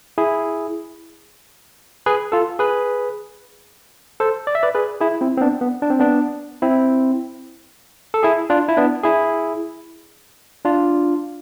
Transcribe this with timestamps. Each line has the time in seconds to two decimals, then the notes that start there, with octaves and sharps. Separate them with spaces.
0.18 E4 G#4
2.06 G#4 B4
2.32 F4 A4
2.59 G#4 B4
4.20 A4 C5
4.47 D5
4.55 E5
4.63 B4 D5
4.75 G#4 B4
5.01 E4 G#4
5.21 C4 E4
5.37 C4
5.41 B3 D4
5.61 B3
5.82 D4
5.90 C4
6.00 B3 D4
6.62 C4 E4
8.14 A4
8.23 E4 G#4
8.50 D4 F4
8.69 E4
8.77 B3 D4
9.03 E4 G#4
10.65 D4 F4